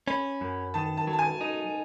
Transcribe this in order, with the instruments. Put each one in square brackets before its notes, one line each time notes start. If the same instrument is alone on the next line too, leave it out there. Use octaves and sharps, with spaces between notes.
[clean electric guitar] C#4 [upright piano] B5
[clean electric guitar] F#2
[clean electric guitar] D#3 [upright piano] A5
[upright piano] A5
[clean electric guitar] F#3
[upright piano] A5
G#5
[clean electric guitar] D#4